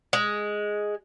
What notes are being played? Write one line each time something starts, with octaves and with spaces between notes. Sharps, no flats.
G#3